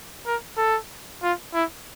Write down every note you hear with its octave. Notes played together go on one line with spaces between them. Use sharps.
A#4
A4
F4
E4